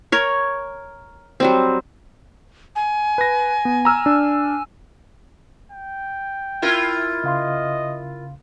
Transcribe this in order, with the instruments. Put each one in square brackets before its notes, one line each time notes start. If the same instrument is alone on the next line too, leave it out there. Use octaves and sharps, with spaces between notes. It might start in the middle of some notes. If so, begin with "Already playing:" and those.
[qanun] A#4 C#5
F#3 G3 C4
[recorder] G#5
[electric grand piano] B4 A#6
B3
A#5 E6 F6
D4
[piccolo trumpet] G5
[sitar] E4 F4 A#4
[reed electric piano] C#3 F5 C6 [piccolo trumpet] D#5